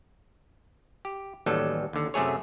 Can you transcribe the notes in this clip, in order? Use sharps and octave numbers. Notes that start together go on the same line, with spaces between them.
G4
A1 D#2 F#3 G3 A4
D#2 D3
F#2 C3 A3 G#4 C#5